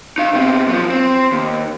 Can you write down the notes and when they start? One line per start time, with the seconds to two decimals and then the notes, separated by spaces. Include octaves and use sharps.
0.18 D#4 F5
0.33 B2 C4
0.68 F3 F#3
0.90 C4
1.31 D#2